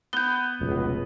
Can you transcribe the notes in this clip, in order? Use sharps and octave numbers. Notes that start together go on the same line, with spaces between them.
B3 G6 G7
F1 C#2 B2